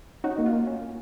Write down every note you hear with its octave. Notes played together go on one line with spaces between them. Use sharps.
C#4 D#4 F#4
A#3
F4
A#3
C#4